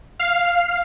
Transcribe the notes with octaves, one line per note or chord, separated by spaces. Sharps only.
F5